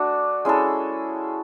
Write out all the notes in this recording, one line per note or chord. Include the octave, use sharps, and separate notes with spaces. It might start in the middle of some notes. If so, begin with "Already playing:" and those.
Already playing: A3 D4 F#4
G#3 C#4 E4 A4